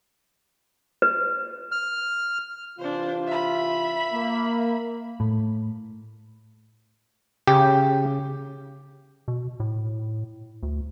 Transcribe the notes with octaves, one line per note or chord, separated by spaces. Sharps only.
B4
F6
C3 E3 D4 F4 C5
E5 B5
A#3
A2
C#3 G4
B2
A2
D2